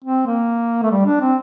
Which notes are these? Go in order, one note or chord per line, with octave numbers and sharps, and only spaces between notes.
C4
A#3
A3
G3
D4
C4